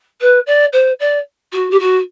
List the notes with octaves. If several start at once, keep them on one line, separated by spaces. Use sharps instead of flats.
B4
D5
C5
D5
F#4
G4
F#4